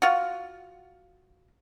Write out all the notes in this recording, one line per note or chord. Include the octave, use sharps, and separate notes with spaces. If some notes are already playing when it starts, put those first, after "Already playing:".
F4 F#4